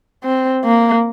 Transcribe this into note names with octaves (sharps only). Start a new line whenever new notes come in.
C4
A#3